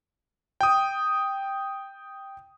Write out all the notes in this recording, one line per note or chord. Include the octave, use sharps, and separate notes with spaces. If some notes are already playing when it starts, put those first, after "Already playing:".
G5 D#6